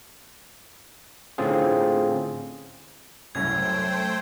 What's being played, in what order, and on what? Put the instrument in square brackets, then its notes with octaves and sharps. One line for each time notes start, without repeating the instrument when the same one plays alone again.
[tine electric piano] A2 D3 C4 C#4 F4 G#4
[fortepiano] C2 F#2 A2 [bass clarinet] F#3 [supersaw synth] A3 C5 G5 [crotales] G#6